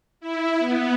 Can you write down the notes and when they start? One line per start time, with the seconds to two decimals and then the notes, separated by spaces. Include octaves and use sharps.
0.20 E4
0.59 B3